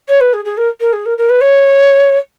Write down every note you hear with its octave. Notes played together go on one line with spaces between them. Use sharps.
C#5
B4
G#4
G#4
A#4
A#4
G#4
A#4
A#4
B4
C#5